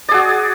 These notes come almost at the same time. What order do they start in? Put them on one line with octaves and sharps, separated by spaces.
D5 G#4 F#4